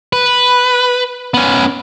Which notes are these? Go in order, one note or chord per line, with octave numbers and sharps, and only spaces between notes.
B4
B3 C#4